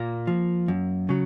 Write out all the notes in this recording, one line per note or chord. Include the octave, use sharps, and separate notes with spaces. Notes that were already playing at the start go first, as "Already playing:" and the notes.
Already playing: A#2 A#3
F3
F#2
C#3 F#3